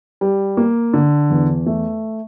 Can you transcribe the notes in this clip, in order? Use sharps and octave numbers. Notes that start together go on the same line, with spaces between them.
G3
A#3
D3
E2
A3